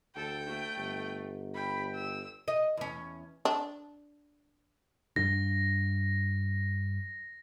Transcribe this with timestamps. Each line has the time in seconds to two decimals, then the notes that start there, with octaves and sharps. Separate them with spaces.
0.16 D2 A4 G5
0.47 A3
0.77 G1
1.55 G5 B5
1.95 E6
2.48 D#5
2.77 E2 C#4
3.45 D4
5.16 G2 G3 D4 A#6